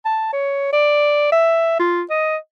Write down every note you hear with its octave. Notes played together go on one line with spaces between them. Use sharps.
A5
C#5
D5
E5
F4
D#5